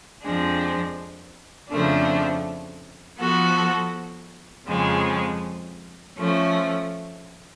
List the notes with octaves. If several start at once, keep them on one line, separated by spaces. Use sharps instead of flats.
F2 F3 G#3 D4
F2 C#3 F3 A3 D4
F3 B3 F#4 A4
F2 C#3 F3 G#3
F3 A3 C#4